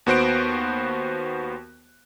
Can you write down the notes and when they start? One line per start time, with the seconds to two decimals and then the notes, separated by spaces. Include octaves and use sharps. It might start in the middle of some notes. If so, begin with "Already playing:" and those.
0.06 D#2 B3 F#4 C5 F#6 D7